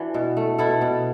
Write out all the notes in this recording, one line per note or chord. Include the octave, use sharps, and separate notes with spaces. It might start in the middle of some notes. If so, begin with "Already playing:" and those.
Already playing: E3 D4 F#4
B2
A3
B2 E4 A4
B2